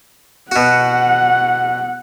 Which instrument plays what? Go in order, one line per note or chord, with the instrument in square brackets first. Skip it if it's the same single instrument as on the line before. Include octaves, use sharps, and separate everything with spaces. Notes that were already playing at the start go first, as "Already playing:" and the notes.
[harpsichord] B2 F#4 [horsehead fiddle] F#5